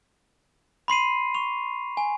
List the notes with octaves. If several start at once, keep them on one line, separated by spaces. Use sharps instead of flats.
B5 C6 C7 D#7
C#6 F7
G#5